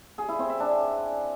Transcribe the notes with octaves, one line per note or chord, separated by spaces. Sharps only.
G#4
E4
C4
E5
D4